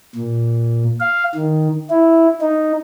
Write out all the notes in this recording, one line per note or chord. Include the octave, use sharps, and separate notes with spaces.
A#2
F5
D#3
E4
D#4